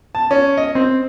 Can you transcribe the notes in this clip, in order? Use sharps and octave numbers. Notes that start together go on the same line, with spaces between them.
A5
C#4
D#5
C4